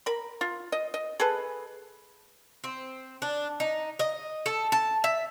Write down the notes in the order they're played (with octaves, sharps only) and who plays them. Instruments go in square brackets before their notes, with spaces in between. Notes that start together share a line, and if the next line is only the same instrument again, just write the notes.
[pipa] A#4 B5
F4
D#5
D#5
G#4 A4 B4
[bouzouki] C4
D4
D#4
D#5
A4
A5
E5